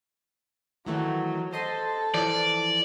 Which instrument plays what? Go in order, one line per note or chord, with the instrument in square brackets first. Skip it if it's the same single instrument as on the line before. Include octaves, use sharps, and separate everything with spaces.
[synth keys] D#3 E3 A3 [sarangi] F#3
[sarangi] A4 [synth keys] C5 D#5 C6
[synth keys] E3 F3 [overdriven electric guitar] D5